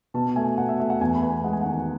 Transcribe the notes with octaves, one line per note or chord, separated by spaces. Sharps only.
B2 A5
A3 G#5
B2 F#5
E5
A3 E5
F#5
E2 G#5
B5
B3
G#5
G#3 F#5
G#5
F#5
D#3